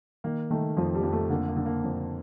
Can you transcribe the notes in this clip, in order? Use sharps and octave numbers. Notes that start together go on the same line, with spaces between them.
D#3 A#3
D#3 A3
F2 F3
G3
F2
A3
D3 A#3
A#3
D3
A#3
F2